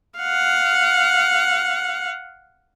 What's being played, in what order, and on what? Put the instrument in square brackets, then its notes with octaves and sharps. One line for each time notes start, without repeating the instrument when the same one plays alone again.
[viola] F5 F#5